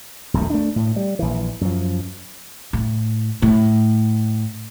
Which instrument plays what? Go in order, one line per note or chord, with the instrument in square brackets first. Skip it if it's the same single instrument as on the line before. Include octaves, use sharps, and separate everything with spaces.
[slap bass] D#1 B1 F#2 A3
A3 D4
A2
G3
A#1 E3
F#2 F3
[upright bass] A2
A2